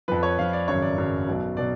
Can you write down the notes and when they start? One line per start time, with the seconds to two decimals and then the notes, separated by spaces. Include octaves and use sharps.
0.08 F2 F3 B4
0.23 C#5
0.38 F2 F3 F5
0.53 D5
0.68 G#1 F#2 C#3 F#3 C#5
0.82 D5
0.97 G#1 F#2 C#3 F#3
1.28 B1 B2 F#3
1.57 B2 F#3 D5